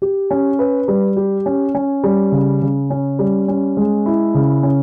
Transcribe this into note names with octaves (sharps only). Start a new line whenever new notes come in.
G4
C#4
B4
G3
G4
C#4
C#4
G3
C#3
C#3
C#4
G3
C#4
G#3
E4
C#3
C#4